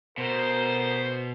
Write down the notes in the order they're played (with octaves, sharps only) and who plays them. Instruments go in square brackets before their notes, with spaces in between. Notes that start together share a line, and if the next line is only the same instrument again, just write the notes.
[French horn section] D2 C5 [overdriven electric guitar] B2 [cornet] A#4